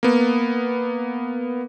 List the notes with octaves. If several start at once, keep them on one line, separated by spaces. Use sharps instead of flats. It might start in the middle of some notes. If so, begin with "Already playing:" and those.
A#3 B3